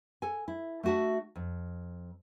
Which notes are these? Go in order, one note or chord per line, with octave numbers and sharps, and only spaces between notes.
A4 G#5
E4
A3 D4 F#4 E5 A5
F2